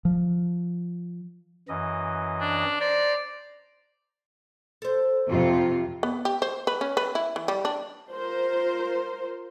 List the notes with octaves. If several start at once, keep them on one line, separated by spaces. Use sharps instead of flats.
F3
F#2 E3 D#5
D4
C5 D5 A#5
A4 C5
F2 C3 F4
B3
G4
C5
B4
C#4
B4
E4
E3
G3
D4
F4 A#4 C5